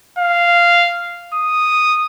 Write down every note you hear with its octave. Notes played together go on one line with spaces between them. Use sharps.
F5
D#6